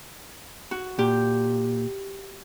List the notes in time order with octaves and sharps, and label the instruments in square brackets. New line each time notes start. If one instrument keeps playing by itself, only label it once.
[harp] F#4
[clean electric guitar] A#2 [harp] G4